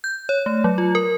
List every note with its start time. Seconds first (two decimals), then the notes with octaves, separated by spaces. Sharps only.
0.04 G6
0.29 C#5
0.46 A3
0.64 F#3
0.78 F4
0.95 A#4